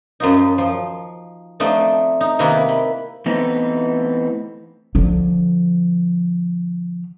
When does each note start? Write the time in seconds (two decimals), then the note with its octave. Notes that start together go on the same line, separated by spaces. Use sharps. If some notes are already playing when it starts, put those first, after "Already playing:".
0.20 F#2 F3 D#4
0.58 F3
1.60 F3 A3 C4 D4 D#4
2.21 D#4
2.39 C3 D#3 A#3 E4 B4
2.69 B5
3.26 E3 A3 B3 C4 D#4
4.95 D3 F3